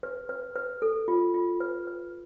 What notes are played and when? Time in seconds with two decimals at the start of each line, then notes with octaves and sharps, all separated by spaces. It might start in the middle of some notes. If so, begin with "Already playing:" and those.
0.03 B4
0.29 B4
0.56 B4
0.82 A4
1.08 F4
1.34 F4
1.60 B4
1.87 B4